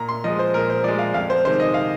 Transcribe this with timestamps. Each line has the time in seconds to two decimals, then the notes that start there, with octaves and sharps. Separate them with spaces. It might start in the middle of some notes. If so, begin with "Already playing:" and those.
Already playing: A#2 A#5
0.09 C6
0.24 F3 G#3 D#5
0.39 C5
0.54 A#2 A#4
0.70 C5
0.84 F3 G#3 D5
0.99 F5
1.14 F2 F5
1.30 C5
1.44 C3 D#3 G#3 C5
1.60 D#5
1.74 F5